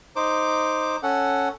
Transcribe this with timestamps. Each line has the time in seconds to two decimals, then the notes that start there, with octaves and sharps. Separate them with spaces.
0.16 D#4 C5 D6
1.03 C#4 A4 F#5